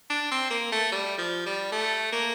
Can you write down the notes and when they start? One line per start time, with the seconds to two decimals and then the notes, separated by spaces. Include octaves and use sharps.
0.10 D4
0.31 C4
0.50 A#3
0.72 A3
0.92 G3
1.18 F3
1.46 G3
1.72 A3
2.12 A#3